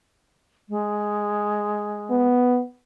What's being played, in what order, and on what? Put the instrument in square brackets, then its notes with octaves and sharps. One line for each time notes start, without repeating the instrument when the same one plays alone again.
[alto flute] G#3
[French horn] B3